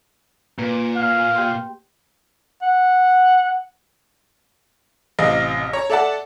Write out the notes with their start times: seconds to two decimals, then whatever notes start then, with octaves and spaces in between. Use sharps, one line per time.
0.59 A#2 A#3 B4
0.96 F5
1.35 G4 G5 C6
2.62 F#5
5.19 A1 C3 D#5 F5
5.73 C#5 A#5
5.90 A4 D5 E5 F#5 A5